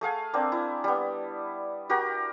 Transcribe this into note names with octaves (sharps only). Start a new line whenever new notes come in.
A3 G#4 F5 G#5
A#3 C4 D4
E4
G3 B3
F#4 G4 A#4